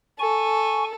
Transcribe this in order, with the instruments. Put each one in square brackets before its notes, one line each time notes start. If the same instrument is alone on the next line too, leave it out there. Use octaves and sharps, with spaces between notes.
[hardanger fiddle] A4 [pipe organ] G#5 C#6